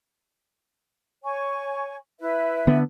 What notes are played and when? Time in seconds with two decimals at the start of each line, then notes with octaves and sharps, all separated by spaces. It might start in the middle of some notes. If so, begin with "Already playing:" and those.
1.24 C#5 G#5 C#6
2.20 E4 B4 E5
2.67 D3 B3